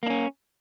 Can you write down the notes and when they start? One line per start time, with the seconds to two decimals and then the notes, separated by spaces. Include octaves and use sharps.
0.03 A#3
0.06 D4
0.10 C#4